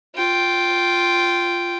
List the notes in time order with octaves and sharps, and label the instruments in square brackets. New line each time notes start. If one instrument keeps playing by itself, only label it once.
[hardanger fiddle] F4 G5